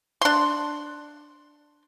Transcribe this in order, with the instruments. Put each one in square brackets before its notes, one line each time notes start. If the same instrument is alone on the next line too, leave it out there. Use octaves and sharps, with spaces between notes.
[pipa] D4 C6